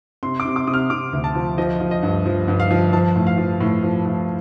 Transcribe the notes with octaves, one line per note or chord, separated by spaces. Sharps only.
C3 C6
D6
C3
D6
C3 D#6
F6
C3 D6
D2
A5
F3
F3 D#5
F3
D#5
G2
F3
G2
F5
F3
F3 A5
A2
F5
F3
A2
F3
A2